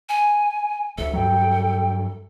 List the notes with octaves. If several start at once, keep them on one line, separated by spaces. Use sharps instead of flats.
G#5
D1 D2 A4 E5
G2 F#3 G5